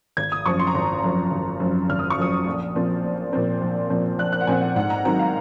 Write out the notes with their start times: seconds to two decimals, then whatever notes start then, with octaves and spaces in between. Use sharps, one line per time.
0.17 G#1 G#6
0.32 D#6
0.46 F#2 F3 C#6
0.59 C6
0.67 A#5
0.75 G#1 C6
1.04 F#2 F3
1.31 G#1
1.60 F#2 F3
1.89 G#1 F6
1.99 D#6
2.10 C#6
2.18 F#2 F3 D#6
2.47 A#1
2.75 A#2 F3 C4
3.04 A#1
3.33 A#2 F3 C4
3.61 A#1
3.90 A#2 F3 C4
4.19 A#1 F#6
4.32 F#6
4.41 F#5
4.47 A#2 F3 C4 G#5
4.61 F#5
4.76 G#2 F#5
4.90 A#5
5.05 D#3 F#3 C4 A#5
5.19 F5